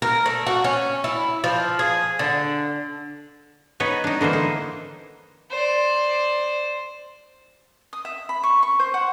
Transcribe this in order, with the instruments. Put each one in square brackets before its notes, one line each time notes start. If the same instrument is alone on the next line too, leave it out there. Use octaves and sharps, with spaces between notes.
[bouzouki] A#4
A3
F#4
C#4
E4
F3
G#4
D3
[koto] B3 D#4 B4 C#5
D4 D#4
D3 E3 A#3 C5
D#4
[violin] C5 D5
[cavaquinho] D#6
E5
B5
C#6
C#6
C5
F#5